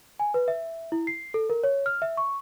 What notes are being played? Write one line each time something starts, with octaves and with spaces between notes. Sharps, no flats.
G#5
B4
E5
E4
C7
A4
A#4
C#5
F6
E5
C#6